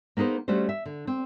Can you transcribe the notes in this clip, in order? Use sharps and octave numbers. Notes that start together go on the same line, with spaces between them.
A#3 B3 D#4 G#4 C5
G3 A3 C#4 F#4 C5
E5
D3
C4